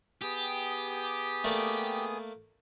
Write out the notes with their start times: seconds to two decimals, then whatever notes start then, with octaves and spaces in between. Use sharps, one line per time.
0.22 B3 G4 G#4 D#6
1.44 A3 A#3 D5